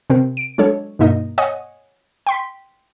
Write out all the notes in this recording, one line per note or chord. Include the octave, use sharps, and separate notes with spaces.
C3 C4 A#4
D7
F#3 G#3 D4 A4 C#5
G2 B2 A#3 D#4 D#5
C#5 D#5 F#5 G#5 D#6
G5 C6 B6